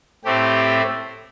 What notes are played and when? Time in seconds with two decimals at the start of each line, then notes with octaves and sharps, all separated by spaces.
0.25 A2 A3 C4 G4